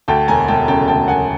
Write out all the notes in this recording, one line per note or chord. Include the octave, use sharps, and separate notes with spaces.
D2 G5 A5
E1 G#5 A#5
E1 G5 A5
C#3 G5 A5
D2 G5 A5
E1 F#5 G#5